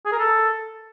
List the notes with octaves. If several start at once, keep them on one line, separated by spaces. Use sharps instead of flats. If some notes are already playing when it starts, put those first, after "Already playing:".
G#4
A#4
A4